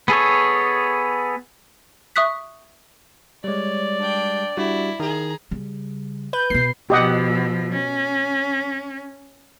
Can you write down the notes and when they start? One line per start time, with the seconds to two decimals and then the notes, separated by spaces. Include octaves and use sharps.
0.08 B3 G#4 A4 C#5
2.16 E5 C#6 D#6 F#6 B6
3.44 G3 G#3 C#5 D5
3.99 D4 G5
4.57 G3 D4 E4 F#4
5.00 D#3 G#4 A#5
5.51 C#3 G3
6.33 B4 G6
6.50 B2 B3 C7
6.90 B2 F3 G4 D#5 F#5
7.73 C#4